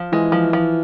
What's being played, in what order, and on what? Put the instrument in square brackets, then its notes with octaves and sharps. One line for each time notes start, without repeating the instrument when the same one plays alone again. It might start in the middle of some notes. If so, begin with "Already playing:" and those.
Already playing: [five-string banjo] F3
[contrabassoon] E3 [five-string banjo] G#3
[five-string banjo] F3
F3